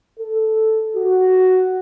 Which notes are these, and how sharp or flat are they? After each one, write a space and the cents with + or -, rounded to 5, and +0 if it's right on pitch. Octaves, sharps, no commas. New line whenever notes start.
A4 +0
F#4 +5